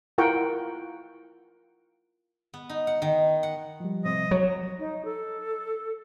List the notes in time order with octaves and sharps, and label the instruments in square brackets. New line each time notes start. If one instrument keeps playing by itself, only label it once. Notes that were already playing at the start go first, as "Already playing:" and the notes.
[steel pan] E4 F4 A#4 F#5 G5 C#6
[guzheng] B3
D#4
F#5
D#3
F#5
[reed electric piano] F3 G3
[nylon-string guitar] C3 [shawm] D#5
[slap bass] F#3 [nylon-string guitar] C#5
[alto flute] D#4
A4